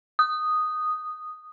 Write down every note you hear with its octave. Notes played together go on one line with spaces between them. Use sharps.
D#6